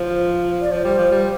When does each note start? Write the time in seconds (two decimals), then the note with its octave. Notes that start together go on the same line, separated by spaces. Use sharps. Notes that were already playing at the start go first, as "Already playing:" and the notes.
Already playing: F3 C5
0.61 D5
0.71 F3 C5
0.84 G3
0.98 F3
1.12 G3